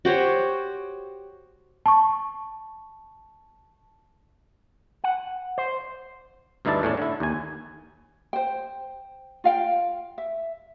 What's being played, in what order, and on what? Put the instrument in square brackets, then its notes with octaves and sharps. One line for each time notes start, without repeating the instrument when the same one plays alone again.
[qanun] F#4 G4 C5 C#5
[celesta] A5 C#6
[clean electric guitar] F#5
C5
[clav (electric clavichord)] D2 G2 D#4 E4 D5 A5
E2 A2 C#4 D4
D3 E4
D#2 G#5
[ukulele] C5 G5
F4 F5 G5
E5